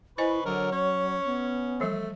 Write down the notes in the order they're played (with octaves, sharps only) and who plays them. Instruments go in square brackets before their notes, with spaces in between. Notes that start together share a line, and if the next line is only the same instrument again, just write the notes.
[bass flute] E4 [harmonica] B4 C#6 [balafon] C5 D#5 G#5
[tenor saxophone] D3 [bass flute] F#3 [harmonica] A#4 C#5
[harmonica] C#4 [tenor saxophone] C#5
[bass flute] B3
[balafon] E3 F3 G3 [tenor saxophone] A3